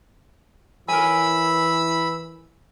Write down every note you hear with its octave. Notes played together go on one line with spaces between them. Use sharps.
E3 A#4 C#5 G#5 B5 E6